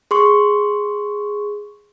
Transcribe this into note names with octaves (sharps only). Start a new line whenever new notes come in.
G#4 C6 C#6